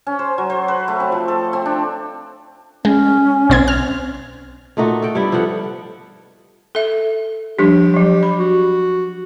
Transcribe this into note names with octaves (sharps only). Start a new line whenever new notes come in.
C#4
C5
F#3
C5
B4
A3
C4
F3
A4
C4
D4
G#3 C#4
B1 C4 G#6
F6
A#2 A3 D#4 F#4
A4 G5
G2 G3 B3 E4
F3 B3 A4 F#5
A4 E5
F3 G3 D4 G4
F3 F#3
B5
F#4